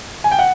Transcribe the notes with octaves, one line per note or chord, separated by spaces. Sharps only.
G#5
G5
F#5